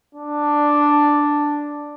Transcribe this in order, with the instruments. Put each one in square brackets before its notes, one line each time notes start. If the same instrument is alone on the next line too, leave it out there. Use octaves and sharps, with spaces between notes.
[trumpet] D4